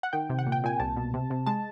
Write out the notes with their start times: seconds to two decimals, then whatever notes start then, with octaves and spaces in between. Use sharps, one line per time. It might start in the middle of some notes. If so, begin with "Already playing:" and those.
0.03 F#5
0.13 D#3 G5
0.29 C3
0.39 F#5
0.46 A#2
0.52 G5
0.64 A#2 G#5
0.80 C2 A5
0.97 B2
1.14 C3
1.30 C3
1.46 G#3 A5